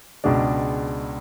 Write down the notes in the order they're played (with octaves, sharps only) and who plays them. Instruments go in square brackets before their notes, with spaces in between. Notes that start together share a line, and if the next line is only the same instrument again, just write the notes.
[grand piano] C#2 B2 G#3 D4